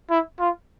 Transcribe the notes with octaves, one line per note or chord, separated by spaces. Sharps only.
E4
F4